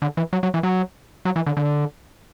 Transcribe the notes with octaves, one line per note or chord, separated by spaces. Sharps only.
D3
E3
F#3
F#3
E3
F#3
F#3
E3
D3
D3